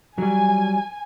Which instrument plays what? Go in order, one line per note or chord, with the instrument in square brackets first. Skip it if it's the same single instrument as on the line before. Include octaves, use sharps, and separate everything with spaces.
[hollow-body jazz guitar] F#3 G3 [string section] G#5